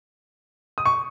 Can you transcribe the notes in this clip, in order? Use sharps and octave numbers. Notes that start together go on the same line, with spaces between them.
D#6
C#6